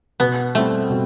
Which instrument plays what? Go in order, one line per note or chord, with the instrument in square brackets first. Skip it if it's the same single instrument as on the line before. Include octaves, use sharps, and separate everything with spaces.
[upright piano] B2 [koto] B3
[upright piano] G3 C4 E4 [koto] A3
[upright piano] B2